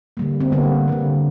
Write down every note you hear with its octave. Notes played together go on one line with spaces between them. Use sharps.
D3 G3 A#3
C4
D3 G3 A#3 B3
D3 G3 A#3